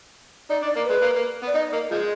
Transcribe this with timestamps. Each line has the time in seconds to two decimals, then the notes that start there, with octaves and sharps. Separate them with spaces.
0.50 D#4 D5
0.62 D4
0.67 D5
0.76 A#3
0.84 B4
0.90 G#3
1.02 A#3
1.16 A#3
1.42 B3
1.47 D5
1.55 D#4 D#5
1.73 A#3
1.91 F3 G#3